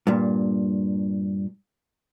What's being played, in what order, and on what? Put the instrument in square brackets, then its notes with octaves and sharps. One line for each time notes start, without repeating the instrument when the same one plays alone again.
[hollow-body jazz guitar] G2 A#2